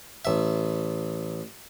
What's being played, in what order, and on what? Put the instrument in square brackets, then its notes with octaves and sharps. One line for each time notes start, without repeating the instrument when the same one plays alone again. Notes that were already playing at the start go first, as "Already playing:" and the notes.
[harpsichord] A1 E5